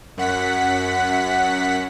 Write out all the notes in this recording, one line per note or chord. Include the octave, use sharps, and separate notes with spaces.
F#2 F#5 B6